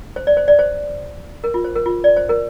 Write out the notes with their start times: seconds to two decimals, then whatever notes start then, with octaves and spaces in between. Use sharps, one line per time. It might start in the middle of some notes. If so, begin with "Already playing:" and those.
0.16 C5
0.27 D5
0.37 C5
0.48 D5
0.59 C5
1.44 A#4
1.54 F4
1.64 C5
1.76 A#4
1.86 F4
2.04 D5
2.17 C5
2.29 A#4